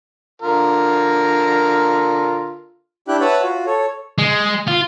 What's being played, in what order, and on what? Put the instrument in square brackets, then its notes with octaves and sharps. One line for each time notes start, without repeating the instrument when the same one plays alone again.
[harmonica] D3 F4 A#4
[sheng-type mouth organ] D4 E4 G4 G5 F#6
B4 C#5 E5 F#5 A5 B5
F4 F#4
A4 C#5
[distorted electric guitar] G#3
F4